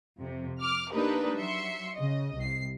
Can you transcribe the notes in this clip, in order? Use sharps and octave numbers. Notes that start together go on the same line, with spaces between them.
F2 C3
D6 F6
A#3 D4 D#4 G4 A#4 B4
F#3 E5 C6 C#7
C#3 D#5
C2 C7